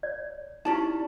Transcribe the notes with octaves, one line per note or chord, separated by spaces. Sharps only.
C#5 D5
C#4 D#4 E4 G4 D5 A5